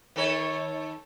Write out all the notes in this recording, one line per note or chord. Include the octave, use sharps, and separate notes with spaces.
D#3 A4 C#5